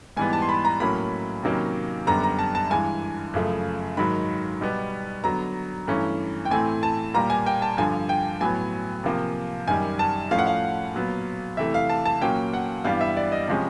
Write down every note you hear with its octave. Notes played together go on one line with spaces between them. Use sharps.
G#2 E3 G3 B3 G#5
A5
C6
B5
A#5
A2 F#3 A#3 C#4 B5
C3 D#3 F#3 A#3 C#4
F#2 D3 G3 B3 A#5
A#5
A5
A5
G2 E3 G#3 G#5
F#2 C#3 F3 A3
G#2 D#3 F#3 B5
B2 G3 B3
D3 F#3 B3 A#5
G2 E3 A3 C#4
G5
A2 E3 A3 C4 G#5
A5
A#2 G3 A#3 A#5
G#5
G5
A5
G2 D3 F3 G#5
G5
A2 F#3 B3 G#5
C3 F3 A#3
F#2 D#3 G3 G#5
A5
A2 F3 A3 C#4 F5
F#5
F5
A#2 F#3 B3
C3 E3 A3 E5
F5
A5
A5
A#2 F#3 A#3 C#4 G5
F#5
G2 E3 G3 B3 F5
E5
D5
D#5
C3 F3 G#3 C#4